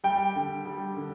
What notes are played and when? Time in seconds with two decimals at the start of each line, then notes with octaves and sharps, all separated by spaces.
0.04 G3 G5
0.36 D3
0.66 G3
0.97 D3